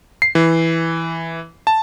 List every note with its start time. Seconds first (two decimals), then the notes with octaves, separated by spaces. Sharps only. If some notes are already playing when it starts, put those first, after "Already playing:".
0.22 C7
0.35 E3
1.67 A5